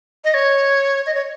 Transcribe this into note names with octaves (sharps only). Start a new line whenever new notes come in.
D#5
C#5
D#5
C#5